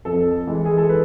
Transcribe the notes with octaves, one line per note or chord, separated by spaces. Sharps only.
F2 A4
E3 G#3
G#4
A4
B4